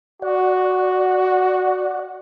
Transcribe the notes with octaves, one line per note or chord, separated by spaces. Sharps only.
F#4 D5 F#5